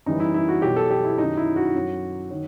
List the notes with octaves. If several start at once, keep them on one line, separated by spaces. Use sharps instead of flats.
F#2 E3 G3 D#4
E4
E4
F#4
B2 F#3 G4
A4
G4
E4
F#2 D#3 F#3 D#4
E4
F#4
F#2 F#3
D#3 F#3